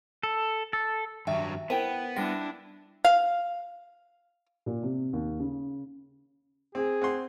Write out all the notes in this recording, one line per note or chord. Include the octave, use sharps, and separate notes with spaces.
A4
A4
G2 D#3 F#3 E5 G5
B3 E4 A#4 C5 G5 A5 D#7
G3 D4 E4 G5 A#6
F5
A#2
C3
D#2
C#3
C4 G#4
C4 F#5 C6